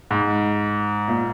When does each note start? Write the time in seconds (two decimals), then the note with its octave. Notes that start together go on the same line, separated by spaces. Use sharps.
0.11 G#2
1.08 A#2